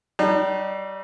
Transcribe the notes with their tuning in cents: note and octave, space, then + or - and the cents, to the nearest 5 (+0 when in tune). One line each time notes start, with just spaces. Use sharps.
G3 -30 D#4 -45